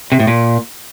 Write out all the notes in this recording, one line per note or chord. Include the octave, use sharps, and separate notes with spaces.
C3
A2
A#2